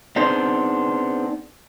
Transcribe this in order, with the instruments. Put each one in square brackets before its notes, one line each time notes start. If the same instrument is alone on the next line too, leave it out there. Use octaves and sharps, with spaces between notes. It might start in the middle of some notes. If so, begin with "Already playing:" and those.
[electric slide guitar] B3 C4 D4 D#4 G#4 C5